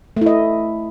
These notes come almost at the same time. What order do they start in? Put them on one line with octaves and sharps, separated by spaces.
A3 E4 D#5